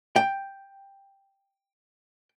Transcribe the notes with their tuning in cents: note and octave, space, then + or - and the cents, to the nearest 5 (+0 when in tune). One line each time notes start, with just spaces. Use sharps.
G5 +5